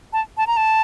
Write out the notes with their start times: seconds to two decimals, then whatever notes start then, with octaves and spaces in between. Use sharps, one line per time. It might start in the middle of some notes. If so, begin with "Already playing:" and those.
0.13 A5
0.37 A5
0.47 A#5
0.57 A5